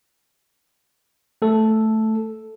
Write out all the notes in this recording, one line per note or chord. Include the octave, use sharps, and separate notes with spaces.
A3 A4